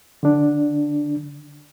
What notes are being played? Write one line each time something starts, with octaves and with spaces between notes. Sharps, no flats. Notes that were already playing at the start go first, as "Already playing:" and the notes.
D3 D4